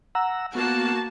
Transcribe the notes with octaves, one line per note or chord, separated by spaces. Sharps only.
F#5 A#5 E6
A#3 B3 F#4 A5